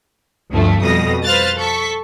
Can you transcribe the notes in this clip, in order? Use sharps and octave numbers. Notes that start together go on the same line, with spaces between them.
D2 G2 F3 A3
F2 B2 G3 D#6 A#6
B4 C5 F5 F6 F#6 A6
A4 C#6 B6